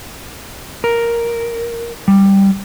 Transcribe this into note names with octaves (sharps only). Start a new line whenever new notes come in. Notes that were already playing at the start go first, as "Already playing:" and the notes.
A#4
G3